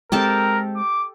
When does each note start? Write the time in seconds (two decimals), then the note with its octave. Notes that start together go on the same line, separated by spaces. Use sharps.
0.12 G#3 B3 C4 G4 A4 A#4 A5
0.76 D6